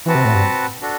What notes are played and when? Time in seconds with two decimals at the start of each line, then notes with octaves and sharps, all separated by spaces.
0.06 E3 C4 F#4 B4 F#5 A5
0.15 C3
0.25 A2
0.35 G2
0.81 D4 F#4 A4